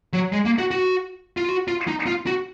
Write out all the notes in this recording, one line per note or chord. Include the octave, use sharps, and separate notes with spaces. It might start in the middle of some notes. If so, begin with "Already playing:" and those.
F#3
G#3
A#3
F#4
F#4
F4
F#4
F4
D#4
F4
F#4